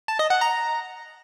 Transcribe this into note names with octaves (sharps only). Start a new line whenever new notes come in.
A5
D#5
F#5
A#5